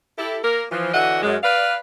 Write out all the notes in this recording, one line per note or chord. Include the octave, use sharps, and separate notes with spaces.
E4 G4 A4
A#3 A#4
E3 F3
D3 E3 F#4 D#5 E5 F#5
F#2 G#3
B4 D5 F5